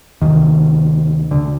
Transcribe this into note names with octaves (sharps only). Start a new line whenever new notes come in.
D2 C3 D#3
D3